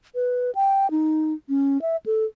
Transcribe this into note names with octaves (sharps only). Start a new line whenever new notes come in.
B4
G5
D#4
C#4
E5
A4